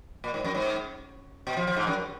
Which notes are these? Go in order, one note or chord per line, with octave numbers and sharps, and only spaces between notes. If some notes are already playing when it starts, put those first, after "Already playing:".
A#2
G#2
F#2
G#2
B2
F3
F3
G#2
F#2